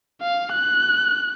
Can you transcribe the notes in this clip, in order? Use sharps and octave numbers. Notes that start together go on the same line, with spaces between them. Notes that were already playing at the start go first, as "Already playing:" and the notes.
F5
F#6